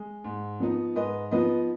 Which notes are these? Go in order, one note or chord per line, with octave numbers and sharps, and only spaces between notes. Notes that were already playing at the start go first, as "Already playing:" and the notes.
Already playing: G#3
G#2
F3 B3 D#4
G#2 B4 D#5
F3 B3 D#4 B4 D#5